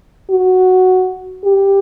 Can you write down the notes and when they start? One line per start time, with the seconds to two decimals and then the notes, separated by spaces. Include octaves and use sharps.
0.30 F#4
1.44 G4